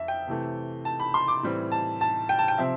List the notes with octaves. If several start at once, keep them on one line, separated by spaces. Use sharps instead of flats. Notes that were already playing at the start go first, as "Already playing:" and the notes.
Already playing: F2 E5
G5
C3 E3 A3
A5
B5
C6
D6
A2 E3 G3 C4
A5
A5
G5
A5
G5
C3 F3 C4 E5